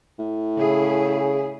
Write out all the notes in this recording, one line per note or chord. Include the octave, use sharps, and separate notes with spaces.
A2
C#3 E4 G#4